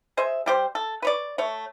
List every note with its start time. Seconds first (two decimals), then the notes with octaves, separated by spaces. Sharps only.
0.17 G#4 C5 D#5 E5
0.46 G3 G4 C5
0.75 A4
1.02 B4 C#5 D5
1.38 A3 C#5